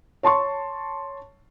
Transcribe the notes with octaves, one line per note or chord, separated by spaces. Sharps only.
C#5 A5 C6 C#6